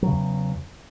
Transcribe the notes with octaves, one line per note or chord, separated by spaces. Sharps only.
E2 C#3 F#3